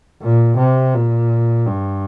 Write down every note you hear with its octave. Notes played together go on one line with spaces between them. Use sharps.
A#2
C3
A#2
G2